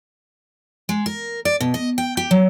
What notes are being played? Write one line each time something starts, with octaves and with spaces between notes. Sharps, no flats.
G#3
A#4
D5
B2
D#5
G5
G4
F#3